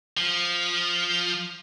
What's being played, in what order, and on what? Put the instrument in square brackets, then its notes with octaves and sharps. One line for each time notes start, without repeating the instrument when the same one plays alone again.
[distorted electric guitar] F3